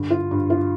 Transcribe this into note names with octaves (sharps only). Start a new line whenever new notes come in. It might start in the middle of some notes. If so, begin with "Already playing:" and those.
Already playing: G2 D3
F4
G2
F4